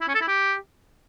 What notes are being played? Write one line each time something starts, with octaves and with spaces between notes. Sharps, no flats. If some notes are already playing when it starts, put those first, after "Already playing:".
E4
C#4
A4
E4
G4